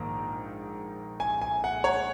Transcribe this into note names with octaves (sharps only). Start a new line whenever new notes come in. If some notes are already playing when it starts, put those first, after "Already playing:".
Already playing: A#1 G#2 D#3 A#3 A#5
G#5
G#5
F#5
C#5